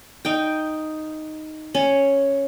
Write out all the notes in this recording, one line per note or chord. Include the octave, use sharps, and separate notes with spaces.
D#4 G5
C#4